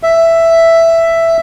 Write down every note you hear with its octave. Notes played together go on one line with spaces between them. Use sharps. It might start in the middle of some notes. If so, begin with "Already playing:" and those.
E5